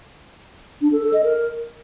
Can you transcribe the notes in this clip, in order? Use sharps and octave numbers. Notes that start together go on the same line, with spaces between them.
D4
A4
A4
D#5
A#4